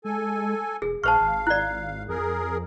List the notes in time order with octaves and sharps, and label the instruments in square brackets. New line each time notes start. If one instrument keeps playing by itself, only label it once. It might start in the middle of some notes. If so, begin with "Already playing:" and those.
[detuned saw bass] G#3 [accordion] A4 G#5
[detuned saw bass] E1 [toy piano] G#4
[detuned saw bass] A#1 [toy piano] C5 C#6 [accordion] F5 [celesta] A5 F6
[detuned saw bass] G#1
[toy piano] E4 D5 [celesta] F#6
[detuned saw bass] F2 [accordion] G#4 A#4